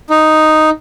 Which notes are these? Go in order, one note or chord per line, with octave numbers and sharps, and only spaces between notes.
D#4